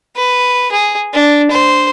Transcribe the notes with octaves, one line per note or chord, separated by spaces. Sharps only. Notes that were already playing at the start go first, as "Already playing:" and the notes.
B4
G#4
D4
C5